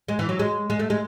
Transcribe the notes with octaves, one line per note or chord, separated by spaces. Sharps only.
G#3
E3
F#3
G#3
G#3
A3
G#3